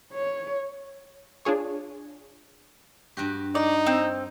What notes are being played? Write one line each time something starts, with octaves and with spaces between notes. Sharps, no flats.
C#5
D4 F4 G#4 C#5
G2 F#4 G4
D#4 D5
C4